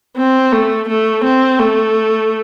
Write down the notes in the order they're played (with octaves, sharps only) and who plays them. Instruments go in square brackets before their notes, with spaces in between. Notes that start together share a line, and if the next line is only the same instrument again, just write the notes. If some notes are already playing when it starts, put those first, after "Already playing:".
[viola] C4
A3
A3
C4
A3